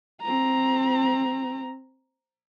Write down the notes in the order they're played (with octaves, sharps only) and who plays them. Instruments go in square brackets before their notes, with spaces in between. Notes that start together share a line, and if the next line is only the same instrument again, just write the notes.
[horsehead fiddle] C4 A#5